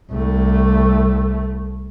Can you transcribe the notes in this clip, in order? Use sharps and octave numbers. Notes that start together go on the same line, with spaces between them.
C2 A3